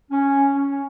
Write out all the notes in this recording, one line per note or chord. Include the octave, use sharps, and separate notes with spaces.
C#4
C#4